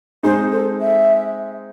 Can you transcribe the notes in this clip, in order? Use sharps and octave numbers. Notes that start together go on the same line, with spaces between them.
G#3 C4 D#4 C5
A4
E5